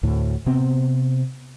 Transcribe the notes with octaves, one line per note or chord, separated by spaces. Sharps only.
D2 A2
C3 B3 C4